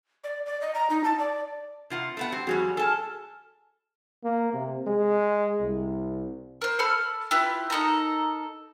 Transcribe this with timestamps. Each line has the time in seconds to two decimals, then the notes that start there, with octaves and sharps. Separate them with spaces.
0.24 D5
0.46 D5
0.61 D#5
0.75 A#5
0.90 D#4
1.04 A5
1.19 D5
1.90 C3 F4 F#5
2.17 A3 B3 F#5
2.32 C4 G4
2.47 F2 F#3 G3 F#4 G#4 F#5
2.77 A4 G#5 A5 F6
4.24 A#3
4.53 C3
4.87 G#3
5.60 C2
6.62 A#4 C5
6.79 A4 A5 B5 F6
7.31 E4 F4 G4 B4
7.70 D#4 A4 A#4 A#5